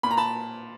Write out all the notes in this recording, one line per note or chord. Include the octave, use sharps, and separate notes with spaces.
A#2 B5
A#5
A5 B5